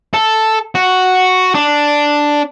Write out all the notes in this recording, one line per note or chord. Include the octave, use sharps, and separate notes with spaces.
A4
F#4
D4